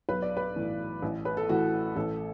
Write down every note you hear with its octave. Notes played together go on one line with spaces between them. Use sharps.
B1 B4
D5
B4
A2 E3
A1
B4
A4
A2 E3 F#4
A1 A4